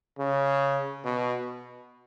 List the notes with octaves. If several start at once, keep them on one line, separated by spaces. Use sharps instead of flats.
C#3
B2